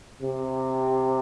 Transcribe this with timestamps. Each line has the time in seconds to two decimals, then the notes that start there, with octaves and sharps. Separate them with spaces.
0.22 C3